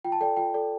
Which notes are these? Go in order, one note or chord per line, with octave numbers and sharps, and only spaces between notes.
F4 G5
A5
A4 D5 G5
F4 G5
A4 D5